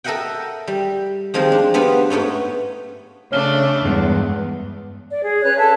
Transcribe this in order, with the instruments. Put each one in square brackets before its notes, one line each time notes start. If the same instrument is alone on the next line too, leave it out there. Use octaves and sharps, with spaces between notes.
[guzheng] A4 A#4 D#5 E5 F#5 G5
G3
D#3 F3 G#3 C4 F4
D4
G3 B3 D4 F4
G#2 A3 B3 C#4
[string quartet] C#3 A3 D4 [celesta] C#5 F6 G7
[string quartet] E2 [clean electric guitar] G2 G#3 B3
[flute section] D5
G#4
C#4 B4 C#5 F#6
A4 E5 A5